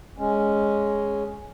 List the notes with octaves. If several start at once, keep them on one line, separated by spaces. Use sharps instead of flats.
G#3 C#4